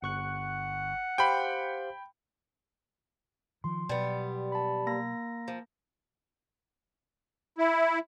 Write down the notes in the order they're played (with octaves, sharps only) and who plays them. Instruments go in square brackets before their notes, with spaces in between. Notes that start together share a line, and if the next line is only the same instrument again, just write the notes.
[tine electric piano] G1 C#6 F#6 [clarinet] F#5
[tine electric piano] G4 C5 F5 [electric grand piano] G5 B5
[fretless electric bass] D#3 F3 [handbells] C6
[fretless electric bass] B2 F#3 [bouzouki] G3 B3
[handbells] A5 B5
A#3 A#5 A#6
[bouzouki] F3
[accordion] E4